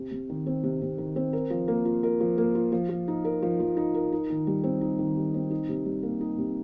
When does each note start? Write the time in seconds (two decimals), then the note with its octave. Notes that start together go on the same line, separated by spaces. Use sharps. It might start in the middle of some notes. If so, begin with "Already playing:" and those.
Already playing: C3
0.11 C3
0.29 D#3
0.46 C4
0.64 C3
0.82 C3
0.98 D#3
1.16 C4
1.33 A#4
1.50 F3
1.68 A#3
1.85 F4
2.03 A#4
2.20 F3
2.38 A#3
2.55 F4
2.72 F3
2.89 F3
3.08 D#4
3.24 A#4
3.43 F3
3.60 F3
3.77 D#4
3.94 A#4
4.12 D#4
4.30 D#3
4.47 G3
4.64 C4
4.81 D#4
4.99 D#3
5.17 G3
5.34 C4
5.51 D#4
5.69 C3
5.85 G3
6.03 A#3
6.21 D#4
6.38 C3